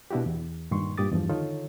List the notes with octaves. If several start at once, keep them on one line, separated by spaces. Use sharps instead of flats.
B2 D4 E4 F#4 G4
E2
G2 A#2 D#3 G3 C6 C#6
G2 A#2 G4 D6 D#6 A6
E2 G2 F3
D3 D#3 D#4 F4 A4 C#5